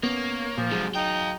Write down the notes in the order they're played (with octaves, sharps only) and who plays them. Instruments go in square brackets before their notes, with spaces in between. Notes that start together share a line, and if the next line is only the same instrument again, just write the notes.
[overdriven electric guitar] A#3 [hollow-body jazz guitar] B3 C#4 [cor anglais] C#5
[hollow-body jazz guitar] A#2 [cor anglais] F3
[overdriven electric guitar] G#2 C3 [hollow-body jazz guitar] F#3 G#4
[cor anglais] D#4 [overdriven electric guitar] F5 G5